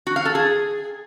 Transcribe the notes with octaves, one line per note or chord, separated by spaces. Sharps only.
F#4
F5
A4
G#4